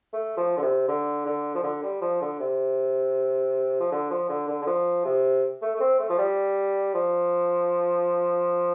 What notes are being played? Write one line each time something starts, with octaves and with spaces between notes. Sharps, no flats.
A3
F3
D3
C3
D3
D3
F3
D3
G3
F3
D3
C3
F3
D3
F3
D3
D3
D3
F3
C3
A3
A3
C4
A3
F3
G3
F3